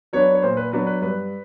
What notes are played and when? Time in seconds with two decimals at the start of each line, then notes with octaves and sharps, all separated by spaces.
0.13 F#3 B3 D4 C#5
0.35 C#5
0.42 A#2 C5
0.57 B4
0.72 F#3 B3 D4 B4
0.87 B4
1.01 G2 B4